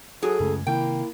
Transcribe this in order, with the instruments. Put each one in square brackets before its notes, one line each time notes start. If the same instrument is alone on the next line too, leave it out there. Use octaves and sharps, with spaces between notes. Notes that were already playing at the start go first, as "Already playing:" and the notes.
[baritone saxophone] F#3 [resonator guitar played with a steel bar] G#4 [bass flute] A4
[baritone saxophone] C#2 [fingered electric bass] F#2 C#3 A3
[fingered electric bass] C3 D#3 C4 [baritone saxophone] A#3 [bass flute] E4 [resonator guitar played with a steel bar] G5